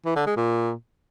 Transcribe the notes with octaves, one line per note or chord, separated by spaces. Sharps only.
E3
D3
G#3
A#2